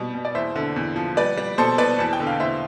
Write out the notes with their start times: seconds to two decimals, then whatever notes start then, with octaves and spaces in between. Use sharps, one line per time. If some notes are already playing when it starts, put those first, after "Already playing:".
Already playing: B2 G3
0.15 B2
0.25 D5
0.35 E2 C5 E5
0.56 D3
0.76 E2
0.96 F3
1.17 G3 B4 D5
1.37 G3
1.58 B2 A4 C5
1.78 B2 B4 D5
1.99 E2 A5
2.13 G5
2.20 D3
2.27 F5
2.40 E2 C5 E5